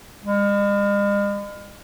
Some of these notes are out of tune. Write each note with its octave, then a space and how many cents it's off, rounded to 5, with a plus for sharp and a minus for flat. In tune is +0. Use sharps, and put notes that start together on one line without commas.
G#3 -45